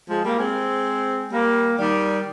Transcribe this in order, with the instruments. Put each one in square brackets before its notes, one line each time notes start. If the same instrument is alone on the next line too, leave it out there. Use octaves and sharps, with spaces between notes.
[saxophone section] F3 G#3
G3 A#3
G#3 C4
G3 A#3
D#3 G3